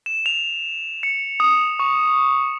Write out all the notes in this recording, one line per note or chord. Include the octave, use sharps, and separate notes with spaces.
E7
F7
C#7
D#6
C#6